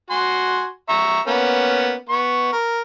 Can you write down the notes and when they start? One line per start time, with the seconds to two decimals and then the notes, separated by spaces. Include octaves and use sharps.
0.10 F#4 G#5 C6
0.89 E5 A#5 C#6
1.27 A#3 B3 C#4
2.09 B3 C#6
2.53 A#4